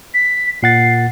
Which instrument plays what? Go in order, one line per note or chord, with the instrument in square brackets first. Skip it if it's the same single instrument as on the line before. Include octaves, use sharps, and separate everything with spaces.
[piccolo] B6
[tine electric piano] A#2 F#5 A6 [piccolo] C7